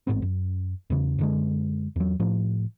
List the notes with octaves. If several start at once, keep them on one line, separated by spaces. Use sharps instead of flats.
A1 G#2 B3 C4
F#2
E2 C#3
F#2 D3 G#3
E2 F#3
A2 F3